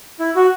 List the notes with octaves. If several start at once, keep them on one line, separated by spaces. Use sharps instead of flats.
E4
F#4